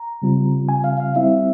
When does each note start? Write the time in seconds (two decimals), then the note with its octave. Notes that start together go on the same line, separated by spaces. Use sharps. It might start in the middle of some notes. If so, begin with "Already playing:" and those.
Already playing: A#5
0.22 C#3 G3 C4 F4
0.69 G#5
0.84 F5
1.00 F5
1.16 G3 C4 E4 E5